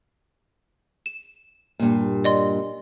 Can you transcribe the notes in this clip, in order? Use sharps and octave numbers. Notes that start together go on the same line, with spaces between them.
E7
G2 A#2
D5 D#5 C6